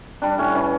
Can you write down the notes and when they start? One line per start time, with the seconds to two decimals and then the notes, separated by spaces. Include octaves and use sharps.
0.22 G3 D4
0.38 A2 C#4
0.55 E3 C#4